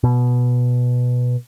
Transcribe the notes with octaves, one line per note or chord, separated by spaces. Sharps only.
B2